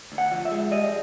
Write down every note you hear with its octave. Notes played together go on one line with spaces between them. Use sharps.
D2
F#5
F3
E5
G#3
G3 D#5